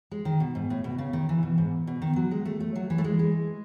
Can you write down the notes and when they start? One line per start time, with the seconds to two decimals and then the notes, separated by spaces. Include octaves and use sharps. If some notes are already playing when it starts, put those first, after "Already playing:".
0.11 G#3
0.25 D#3
0.40 B2
0.55 G#2
0.70 A2
0.84 B2
0.98 C#3
1.13 D#3
1.29 E3
1.43 B2
1.58 G#2
1.87 B2
2.02 D#3
2.16 F#3
2.31 G#3
2.45 A3
2.60 A3
2.75 F#3
2.90 E3
2.98 A3
3.04 G#3
3.19 G#3